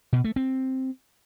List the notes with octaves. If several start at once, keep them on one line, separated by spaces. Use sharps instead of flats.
B2
A3
C4